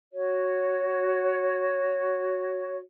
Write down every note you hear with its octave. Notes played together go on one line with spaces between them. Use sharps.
F#4 C#5